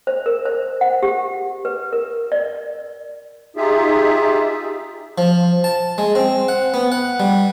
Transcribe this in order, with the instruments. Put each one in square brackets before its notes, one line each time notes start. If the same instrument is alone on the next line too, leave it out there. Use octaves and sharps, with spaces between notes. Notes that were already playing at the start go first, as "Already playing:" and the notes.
[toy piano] C5
A#4
C5
F#5
G4
B4
A#4
D5
[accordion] D#4 F4 G4 G#4 E5
[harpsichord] F3
A5
G#3
C4
F#5
B3
F#5
G3